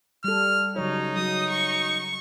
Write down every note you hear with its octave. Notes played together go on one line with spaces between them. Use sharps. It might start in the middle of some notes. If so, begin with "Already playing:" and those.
G3 A4 F6
C#3 F#3 D#4 C#5
F#3 D#6
C#6